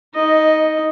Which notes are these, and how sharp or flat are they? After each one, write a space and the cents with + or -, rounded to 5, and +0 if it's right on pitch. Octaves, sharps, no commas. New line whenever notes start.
D#4 +20 D#5 +0